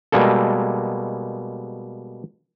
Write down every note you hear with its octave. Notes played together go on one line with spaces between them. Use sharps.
B2 G3 G#3 A#3 A4